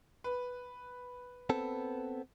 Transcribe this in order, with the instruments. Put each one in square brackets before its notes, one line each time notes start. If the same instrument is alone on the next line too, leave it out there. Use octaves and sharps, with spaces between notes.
[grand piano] B4
[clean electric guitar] B3 C4 A4